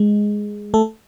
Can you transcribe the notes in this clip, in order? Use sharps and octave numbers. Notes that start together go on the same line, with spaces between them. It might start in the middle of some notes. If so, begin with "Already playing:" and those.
Already playing: G#3
A3 A4